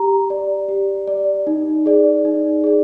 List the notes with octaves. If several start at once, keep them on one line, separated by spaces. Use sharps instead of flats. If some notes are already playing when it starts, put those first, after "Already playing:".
Already playing: G4 A#5
D5
G4
D5
D#4
G#4 D5
D#4
G#4 D5